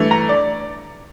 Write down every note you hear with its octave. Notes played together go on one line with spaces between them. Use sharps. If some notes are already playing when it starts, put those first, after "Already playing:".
Already playing: G2 E3 A3
A#5
D5